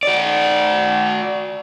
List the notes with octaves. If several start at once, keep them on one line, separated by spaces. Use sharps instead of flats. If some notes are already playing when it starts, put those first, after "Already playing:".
F#4 D5